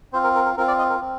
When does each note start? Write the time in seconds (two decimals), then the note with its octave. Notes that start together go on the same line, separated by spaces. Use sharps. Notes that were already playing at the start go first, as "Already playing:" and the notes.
0.13 C4 F4 C5
0.24 A#4
0.35 A#4
0.46 A#4
0.57 C4 F4 A#4
0.68 D5
0.79 D#5
0.90 A#4
1.01 C4